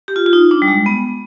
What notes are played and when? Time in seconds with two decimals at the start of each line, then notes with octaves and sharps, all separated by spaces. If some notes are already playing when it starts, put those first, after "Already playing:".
0.08 G4
0.16 F4
0.26 F4
0.33 D#4
0.51 D4
0.62 G3
0.68 G#3
0.86 B3